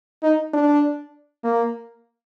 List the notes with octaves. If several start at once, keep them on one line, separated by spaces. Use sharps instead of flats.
D#4
D4
A#3